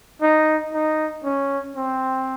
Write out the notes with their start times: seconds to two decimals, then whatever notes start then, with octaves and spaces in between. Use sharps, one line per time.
0.22 D#4
0.73 D#4
1.24 C#4
1.76 C4